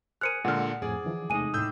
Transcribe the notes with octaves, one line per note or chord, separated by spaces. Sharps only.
G#4 A#4 C5 F6 F#6 C#7 D#7
A#2 D3 G#3 F#5 F6
F2 A2 G#4 D5 G#5
D3 E3 F3
E2 C3 G#3 A3 D#4 G#5 D#7
A2 D4 E6 G6